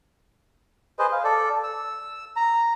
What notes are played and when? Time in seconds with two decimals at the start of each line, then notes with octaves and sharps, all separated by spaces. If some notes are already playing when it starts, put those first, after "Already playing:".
0.99 G#4 B4 C5 D#5
1.12 F5
1.24 A4 D5
1.63 E6
2.36 A#5